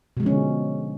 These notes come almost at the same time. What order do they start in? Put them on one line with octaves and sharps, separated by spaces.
B2 G#3 F3 C#4 D3